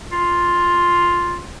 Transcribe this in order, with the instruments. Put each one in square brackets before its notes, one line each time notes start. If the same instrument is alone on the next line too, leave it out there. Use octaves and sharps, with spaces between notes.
[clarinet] F4